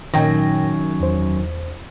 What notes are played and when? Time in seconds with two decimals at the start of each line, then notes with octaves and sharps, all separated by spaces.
0.14 F#2 A#2 D#3 F#3 G5 A#6
1.00 E2 C5